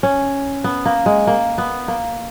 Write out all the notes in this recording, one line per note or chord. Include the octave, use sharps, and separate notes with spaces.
C#4
B3
A#3
G#3
A#3
B3
A#3